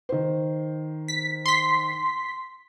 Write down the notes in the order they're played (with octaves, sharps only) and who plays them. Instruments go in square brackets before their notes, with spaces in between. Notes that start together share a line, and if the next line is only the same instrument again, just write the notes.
[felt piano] D#3 C5
[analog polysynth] B6
C6 B6